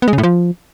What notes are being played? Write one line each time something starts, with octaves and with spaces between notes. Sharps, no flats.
B3
G#3
C#3
A2
F3